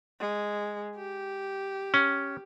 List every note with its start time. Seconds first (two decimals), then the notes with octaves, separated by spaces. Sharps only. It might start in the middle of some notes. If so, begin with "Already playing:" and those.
0.20 G#3
0.96 G4
1.94 C#4